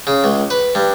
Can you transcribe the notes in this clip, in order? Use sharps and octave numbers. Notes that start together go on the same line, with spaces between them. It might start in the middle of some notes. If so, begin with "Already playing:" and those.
C#3
C#2
B4
G2